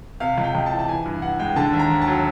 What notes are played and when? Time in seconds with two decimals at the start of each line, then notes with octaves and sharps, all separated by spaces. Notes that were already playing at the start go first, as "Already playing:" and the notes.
0.20 C3 F5
0.38 C#2
0.44 G5
0.55 C#2
0.66 A5
0.71 E3
0.79 A5
0.88 E3 G#5
1.06 G2
1.22 G2 F#5
1.39 G#3 G5
1.56 D3 A5
1.73 D#2
1.79 A#5
1.90 D#2
2.02 A5
2.07 F#3